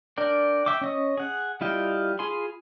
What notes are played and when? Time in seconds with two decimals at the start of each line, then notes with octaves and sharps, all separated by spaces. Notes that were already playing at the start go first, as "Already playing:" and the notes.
0.17 D4 A#4 D5 G5
0.66 E5 G5 D6
0.81 C#4 D#5 D#6
1.17 G#4 F#5
1.61 G3 E4 F4 D#5 G5
2.19 F4 G#4 G#5 B5 C6